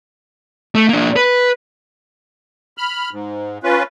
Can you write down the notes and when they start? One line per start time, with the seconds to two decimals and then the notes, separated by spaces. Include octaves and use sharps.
0.75 A3
0.89 A#3 D4
1.16 B4
2.78 B5 F6
3.11 G#2
3.63 C#4 F4 B4